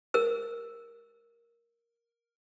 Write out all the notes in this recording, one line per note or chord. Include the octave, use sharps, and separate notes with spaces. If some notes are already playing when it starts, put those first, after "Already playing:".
A#4 E6